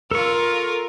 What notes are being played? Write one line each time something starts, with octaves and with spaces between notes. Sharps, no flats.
F4 A4 A#4 C#6